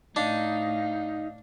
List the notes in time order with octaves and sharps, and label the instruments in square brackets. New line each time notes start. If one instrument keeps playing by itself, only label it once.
[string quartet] A2 [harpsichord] D4 [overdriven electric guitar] D#4 [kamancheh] F5